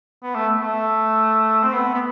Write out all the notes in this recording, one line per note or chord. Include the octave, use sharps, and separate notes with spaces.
B3
A3
A3
C4
B3
B3